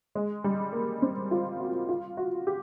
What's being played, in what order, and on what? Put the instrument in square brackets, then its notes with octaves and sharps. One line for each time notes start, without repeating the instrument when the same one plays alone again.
[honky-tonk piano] G#3
G3
A#3
C4
F4
F#4
F4
F#4
G4